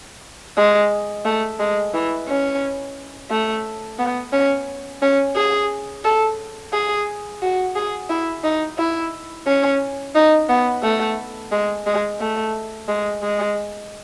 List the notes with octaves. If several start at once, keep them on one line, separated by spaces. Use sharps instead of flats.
G#3
A3
G#3
E3
C#4
A3
B3
C#4
C#4
G#4
A4
G#4
F#4
G#4
E4
D#4
E4
C#4
D#4
B3
A3
G#3
G#3
A3
G#3
G#3